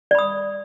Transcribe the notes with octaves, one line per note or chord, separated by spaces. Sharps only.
D5 B5 D#6